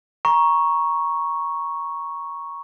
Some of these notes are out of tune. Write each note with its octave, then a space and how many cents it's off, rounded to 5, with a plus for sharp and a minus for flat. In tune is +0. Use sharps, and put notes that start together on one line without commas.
A#5 +20 C#6 +0